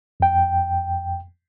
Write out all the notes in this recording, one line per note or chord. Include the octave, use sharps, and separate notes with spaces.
F2 G5